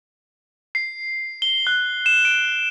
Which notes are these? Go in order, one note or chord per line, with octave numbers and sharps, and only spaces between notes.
C7
G7
F#6
E7
D7